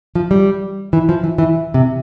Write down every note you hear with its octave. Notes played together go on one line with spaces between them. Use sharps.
F3
G3
E3
F3
E3
E3
C3